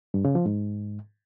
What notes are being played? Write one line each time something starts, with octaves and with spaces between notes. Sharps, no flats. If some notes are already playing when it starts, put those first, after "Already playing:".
G2
C#3
F3
G#2